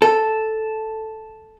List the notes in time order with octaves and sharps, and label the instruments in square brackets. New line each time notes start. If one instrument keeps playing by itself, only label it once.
[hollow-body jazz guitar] A4